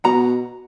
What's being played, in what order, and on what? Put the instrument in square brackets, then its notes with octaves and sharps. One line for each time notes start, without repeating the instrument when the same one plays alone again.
[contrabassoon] B2 [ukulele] F#5 A#5